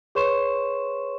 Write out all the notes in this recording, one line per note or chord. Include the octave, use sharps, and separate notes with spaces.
G#4 B4 C#5 C6 C#6 E7